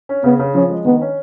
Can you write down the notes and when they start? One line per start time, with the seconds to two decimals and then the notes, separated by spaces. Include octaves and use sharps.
0.09 C#4
0.24 C#3 B3
0.39 C#3
0.55 F3 C#4
0.70 G#3
0.85 D#3 B3
1.01 C#4